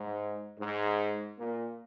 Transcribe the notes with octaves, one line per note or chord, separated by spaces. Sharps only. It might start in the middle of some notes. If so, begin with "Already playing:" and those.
Already playing: G#2
G#2
A#2